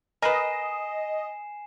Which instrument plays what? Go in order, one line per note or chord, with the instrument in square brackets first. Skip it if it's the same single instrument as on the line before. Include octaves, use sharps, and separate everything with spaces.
[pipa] A#4 B4 [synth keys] D#5 [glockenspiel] G#5 C7 E7